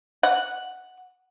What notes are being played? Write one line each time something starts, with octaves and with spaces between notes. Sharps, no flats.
F#5